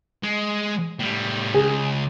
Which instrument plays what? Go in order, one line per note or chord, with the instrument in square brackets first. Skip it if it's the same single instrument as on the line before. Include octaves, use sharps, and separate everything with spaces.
[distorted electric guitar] G#3
A2 G3
[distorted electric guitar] C#2 [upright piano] G#4